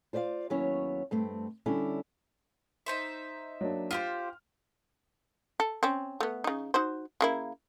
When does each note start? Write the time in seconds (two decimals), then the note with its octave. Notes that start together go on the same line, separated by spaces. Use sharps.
0.13 F4 C5 D5 E5 F5
0.50 D#2 F#3 B3 C#4 E4 C#5
1.11 G2 A3 C4
1.66 D3 G3 C#4 D4 E4 A4
2.86 D#4 C5 E5
3.61 F#3 A#3 D4
3.91 F4 G4 C5 F6
5.60 A4
5.83 C4 C#4
6.20 A3 B3
6.44 C#3 D#4
6.74 D#4 F#4 C5
7.21 C#3 A#3 E4